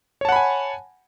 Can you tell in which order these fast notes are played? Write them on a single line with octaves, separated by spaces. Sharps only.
C#5 A5 F#5 B5 G#5